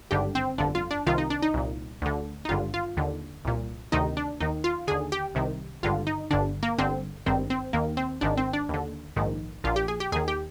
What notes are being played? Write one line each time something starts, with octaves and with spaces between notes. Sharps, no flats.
G#1 G2 D3 G4
C4
G1 F2 D3 D4
F4
D4
C2 C3 D#3 F4
D#4
D4
D#4
C2 A#2
D2 D3
D#4
G#1 G2 D3 F4
F4
D#2 D3
C2 A#2
D2 C3 D#3 D#4
D4
D#2 D#3 D#4
F4
D#2 D3 G#4
G4
C2 C3 D#3
G#1 G2 D3 F4
D#4
G1 G2 D3 D4
A#3
G1 G2 D3 C4
G#1 G2 D#3 C4
C4
D#2 D#3 A#3
C4
G#1 G#2 D#3 D4
C4
D4
D#2 D3
A#1 G#2 D#3
A#1 A#2 F4
G4
G#4
G4
D#2 D#3 G#4
G4